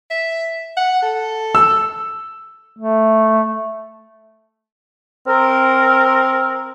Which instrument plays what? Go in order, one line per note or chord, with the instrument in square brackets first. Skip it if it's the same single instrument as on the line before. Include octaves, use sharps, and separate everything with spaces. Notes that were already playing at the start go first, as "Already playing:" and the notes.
[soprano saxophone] E5
F#5
A4
[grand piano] E6
[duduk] A3
[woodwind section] C4 A#4